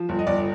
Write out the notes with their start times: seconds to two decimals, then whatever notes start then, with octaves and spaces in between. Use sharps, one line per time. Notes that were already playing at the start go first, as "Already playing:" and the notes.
Already playing: F3
0.09 G1
0.19 D#5
0.27 G1 D5